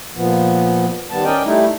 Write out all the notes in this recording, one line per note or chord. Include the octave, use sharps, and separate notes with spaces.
A#2 F3 B3
D#3 G3 B3 A5
C#4 A#4 D5 D#5 G5
G3 A3 D#4 E4